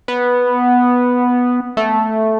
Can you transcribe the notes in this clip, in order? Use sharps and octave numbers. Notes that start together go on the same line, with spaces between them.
B3
A3